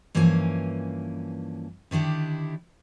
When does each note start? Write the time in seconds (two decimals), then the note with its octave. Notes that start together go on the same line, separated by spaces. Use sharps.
0.15 G2 E3 F3 A#3 C#4 G#5
1.91 D3 D#3 D4 E4 G4